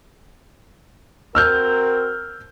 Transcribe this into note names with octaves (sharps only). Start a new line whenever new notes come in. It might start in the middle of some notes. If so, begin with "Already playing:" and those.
C4 F#4 A#4 E6 F6 G6